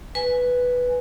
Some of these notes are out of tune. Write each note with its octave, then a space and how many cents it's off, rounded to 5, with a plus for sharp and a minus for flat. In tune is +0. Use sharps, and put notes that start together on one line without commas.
B4 +0 G#5 +0